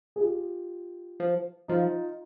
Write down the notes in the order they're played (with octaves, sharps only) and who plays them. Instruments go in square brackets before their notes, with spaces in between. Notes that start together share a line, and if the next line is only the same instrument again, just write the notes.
[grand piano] G#4
F4 G4
[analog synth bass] F3
[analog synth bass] F3 [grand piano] D#4 F4